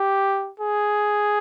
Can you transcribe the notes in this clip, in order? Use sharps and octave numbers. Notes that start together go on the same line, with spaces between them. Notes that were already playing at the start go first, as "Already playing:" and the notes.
Already playing: G4
G#4